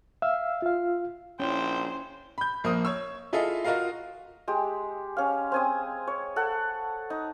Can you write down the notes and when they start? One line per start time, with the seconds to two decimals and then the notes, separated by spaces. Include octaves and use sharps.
0.22 E5 F5 E6
0.62 F4 F5
1.40 A#1 C#4 E4 C5 G5
2.38 B5 G6
2.64 A#1 A#3 C5 D#6
2.85 C#5 C#6 E6
3.33 E4 F4 G#4 A4 D#5 E5
3.65 F4 F#4 A#4 D#5 F5
4.48 G#3 G4
5.17 C#4 F5
5.52 C4 G#5 D#6
6.07 C#5
6.36 A4 F#5
7.10 D#4